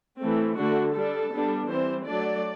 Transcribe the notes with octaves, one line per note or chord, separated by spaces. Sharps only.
E3 A3 C4
D3 A3 D4 F#4
G3 D4 A4
G3 B3 D4
E3 G3 C4 C5
F#3 A3 D4 D5